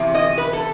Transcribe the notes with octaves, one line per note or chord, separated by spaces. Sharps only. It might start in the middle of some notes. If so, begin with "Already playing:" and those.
Already playing: E2 C3
D#5
B4
A4